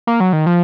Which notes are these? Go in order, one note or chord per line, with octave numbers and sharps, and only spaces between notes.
A#3
F#3
D#3
F3